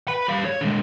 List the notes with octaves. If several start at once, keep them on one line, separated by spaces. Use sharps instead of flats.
B4 B5
G3 F5
C#5
D3 G#3